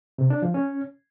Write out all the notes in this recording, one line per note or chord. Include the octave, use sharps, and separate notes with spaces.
C3
D4
F3
C#4